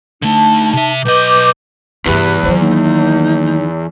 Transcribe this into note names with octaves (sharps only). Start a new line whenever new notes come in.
D3 A3 D#4 A5
C3 E5
B1 B4 D#5 D6 G6
E2 G2 C3 G4 B4
D#3 F#3 C5
A#3 D#4